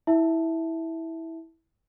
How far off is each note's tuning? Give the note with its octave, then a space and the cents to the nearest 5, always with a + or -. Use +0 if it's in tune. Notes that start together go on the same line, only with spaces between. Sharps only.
E4 -15 E5 +0 A5 +0